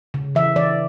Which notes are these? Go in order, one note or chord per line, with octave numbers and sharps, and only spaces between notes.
C#3
E3 E5
E3 D5